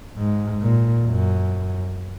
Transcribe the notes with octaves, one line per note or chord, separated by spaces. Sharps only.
G#2
A#2
F#2